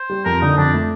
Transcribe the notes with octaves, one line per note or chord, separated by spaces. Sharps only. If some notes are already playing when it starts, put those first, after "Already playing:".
Already playing: C5
G3
F2 A#4
D3 D#4
F2 D4
A3